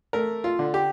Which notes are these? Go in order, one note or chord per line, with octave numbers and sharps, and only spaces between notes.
A3 A#4
F4
D3
G4